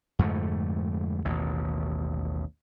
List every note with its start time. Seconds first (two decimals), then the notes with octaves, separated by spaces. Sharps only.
0.19 F2 G#2 D3 A3
1.25 A1 D#2 B2